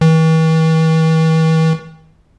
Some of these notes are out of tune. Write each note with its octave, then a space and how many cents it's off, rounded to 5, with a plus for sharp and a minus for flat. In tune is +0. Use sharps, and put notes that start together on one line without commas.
E3 -45